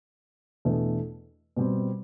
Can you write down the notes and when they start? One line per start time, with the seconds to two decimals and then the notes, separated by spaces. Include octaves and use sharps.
0.65 E2 B2 A3 D4
1.57 B2 G3 C4